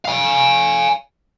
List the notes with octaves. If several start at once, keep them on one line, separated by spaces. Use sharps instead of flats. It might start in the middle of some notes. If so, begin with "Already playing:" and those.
F5 G#5